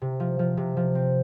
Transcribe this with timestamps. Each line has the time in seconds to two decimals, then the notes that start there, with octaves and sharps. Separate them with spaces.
0.02 C3
0.20 F3
0.39 F3
0.57 C3
0.77 F3
0.95 C4